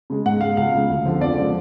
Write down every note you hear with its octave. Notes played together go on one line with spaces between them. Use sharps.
C#3 G#3
G#2 F#5
G#3 F5
C#2 F5
C#3 G#3
D2
D3 F3
F2 D5
C#3 F3 G#3